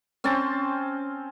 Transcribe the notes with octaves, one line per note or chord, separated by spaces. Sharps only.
C4 C#4 C5 A5